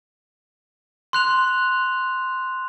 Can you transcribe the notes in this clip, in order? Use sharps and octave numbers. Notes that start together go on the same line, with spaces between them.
C6 F#6 F7